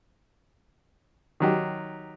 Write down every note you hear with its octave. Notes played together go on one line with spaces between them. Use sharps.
D#3 F#3 G4